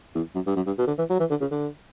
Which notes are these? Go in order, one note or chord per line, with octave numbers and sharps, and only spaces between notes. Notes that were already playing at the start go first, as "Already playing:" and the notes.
E2
F#2
G2
F#2
G2
B2
D3
E3
F#3
E3
D3
C#3
D3